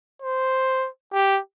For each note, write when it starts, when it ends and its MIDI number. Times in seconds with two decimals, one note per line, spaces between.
0.22 0.88 72
1.13 1.40 67